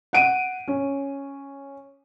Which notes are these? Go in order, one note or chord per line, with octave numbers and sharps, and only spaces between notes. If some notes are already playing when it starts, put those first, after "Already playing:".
F#5 D7 D#7
C#4